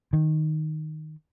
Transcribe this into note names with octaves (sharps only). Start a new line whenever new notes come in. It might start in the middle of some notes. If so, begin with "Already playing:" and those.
D#3